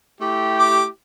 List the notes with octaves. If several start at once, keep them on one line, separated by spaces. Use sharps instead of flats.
A3 E4 G4
D6